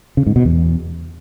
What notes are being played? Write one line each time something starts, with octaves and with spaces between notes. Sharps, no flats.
C#3
G#2
B2
E2